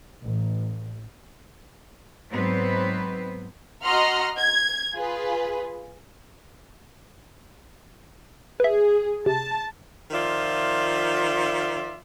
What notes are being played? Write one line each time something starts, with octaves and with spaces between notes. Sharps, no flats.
A1
G#2 F#3 B3 C4 B4 C5
F#4 D#5 F#5 A#5 C6 F6
G#6
F4 G#4 B4
G#4 B4 E5
C3 A5
D#3 F3 F4 D5 E5